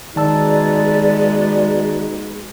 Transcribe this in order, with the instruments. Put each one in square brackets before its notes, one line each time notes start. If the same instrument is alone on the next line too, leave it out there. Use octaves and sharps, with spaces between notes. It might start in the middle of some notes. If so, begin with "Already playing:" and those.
[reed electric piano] D#3 A5 E6 [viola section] G#3 B3 F#4 [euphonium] D#4 [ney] D5